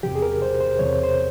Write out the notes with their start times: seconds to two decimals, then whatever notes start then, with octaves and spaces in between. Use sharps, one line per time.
0.03 E2 C3 F3 G4
0.15 G#4
0.22 A#4
0.42 C5
0.61 C5
0.79 E2 C3 F3 C#5
1.04 C5